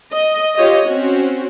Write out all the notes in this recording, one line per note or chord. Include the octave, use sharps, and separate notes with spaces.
D#5
F4 G4 C#5 D#5
C4 C#4 F#4